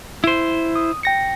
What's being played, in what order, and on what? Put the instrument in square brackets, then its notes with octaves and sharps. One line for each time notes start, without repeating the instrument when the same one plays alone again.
[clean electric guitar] E4 C5
[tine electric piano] D#6
G5 A#6 C#7